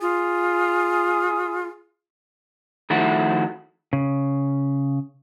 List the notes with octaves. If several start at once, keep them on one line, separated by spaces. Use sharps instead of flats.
F4 G#4
D#3 F3 A3 E4 F#4
C#3